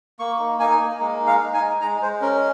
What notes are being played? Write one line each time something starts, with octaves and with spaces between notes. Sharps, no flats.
A#3 C#6
D#4
D#4 G#5
A#3
G#3
D#4
F5
D#4
G#5
G#3
G#3 A#5
G#3 C5
C#4 A#4